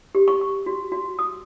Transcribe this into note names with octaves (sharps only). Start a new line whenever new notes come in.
G4
C#6
C#6
F#4
F#4
D#6